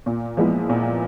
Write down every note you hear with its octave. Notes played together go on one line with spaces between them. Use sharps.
A#2
F3 G#3 B3 E4
A#2